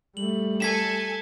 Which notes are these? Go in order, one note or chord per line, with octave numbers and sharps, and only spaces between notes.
G3 A3 F#7
A4 G#5 G#6 B6 E7